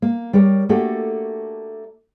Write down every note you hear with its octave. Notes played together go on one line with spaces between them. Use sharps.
A#3
G3 G4 A#4 C#5
A3 A#3 D4 F#4 G4 A4